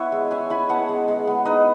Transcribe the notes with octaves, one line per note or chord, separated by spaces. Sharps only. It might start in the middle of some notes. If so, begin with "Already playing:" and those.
Already playing: B3 E4 B4 C#5 E5 F#5
G#3
C#4 E5 G#5
E4 G#5 B5
B3 F#5 A5
G#3
G#3
B3
D#4 B4 D#5